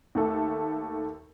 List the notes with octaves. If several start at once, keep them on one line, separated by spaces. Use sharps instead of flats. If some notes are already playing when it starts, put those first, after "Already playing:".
D#2 A3 A4 E5